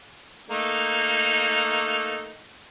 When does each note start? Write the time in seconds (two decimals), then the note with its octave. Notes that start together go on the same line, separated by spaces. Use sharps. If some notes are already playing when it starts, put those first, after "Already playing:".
0.50 A3 A#3 D#4